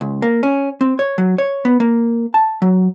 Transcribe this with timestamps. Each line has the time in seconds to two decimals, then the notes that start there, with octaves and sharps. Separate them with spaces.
0.01 C#2
0.22 A#3
0.43 C#4
0.81 C4
0.99 C#5
1.18 F#3
1.38 C#5
1.65 B3
1.80 A#3
2.34 A5
2.62 F#3